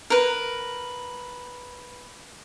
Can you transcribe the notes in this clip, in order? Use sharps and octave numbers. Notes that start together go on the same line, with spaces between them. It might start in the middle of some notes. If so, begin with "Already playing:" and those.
A#4 B4